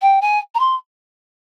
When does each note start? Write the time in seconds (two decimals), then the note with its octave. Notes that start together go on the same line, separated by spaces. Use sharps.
0.02 G5
0.21 G#5
0.55 A#5
0.60 C6